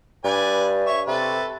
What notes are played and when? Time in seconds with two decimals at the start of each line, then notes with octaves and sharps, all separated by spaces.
0.25 G2 B4 D5 G#5
0.86 C#5 E5
1.07 C3 A4 B4